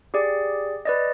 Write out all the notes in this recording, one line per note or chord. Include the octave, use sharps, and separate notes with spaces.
G4 G#4 D5
B4 D5 D#5